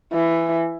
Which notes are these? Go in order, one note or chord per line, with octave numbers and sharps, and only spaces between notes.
E3